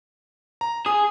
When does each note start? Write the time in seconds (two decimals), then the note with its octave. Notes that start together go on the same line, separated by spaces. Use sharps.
0.61 A#5
0.86 G#4 D#6